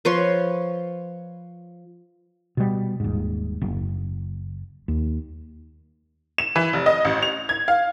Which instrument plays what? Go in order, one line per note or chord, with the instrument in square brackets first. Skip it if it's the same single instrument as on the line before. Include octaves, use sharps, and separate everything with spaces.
[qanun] F3 B4 C#5 C6
[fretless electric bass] B2 G3
D#1 G#2
F#1
D#2
[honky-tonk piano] E7
E3
F1
D#5
A1
F7
G#6
F5